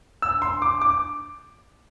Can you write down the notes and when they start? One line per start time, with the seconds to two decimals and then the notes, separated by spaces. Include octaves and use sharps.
0.22 E6
0.42 C6
0.62 D6
0.82 D6